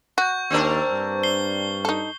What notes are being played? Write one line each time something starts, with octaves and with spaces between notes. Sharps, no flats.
F#4 C#6 G6
D#2 C4 D4 A#4
G2
C7 G7
D#4 A4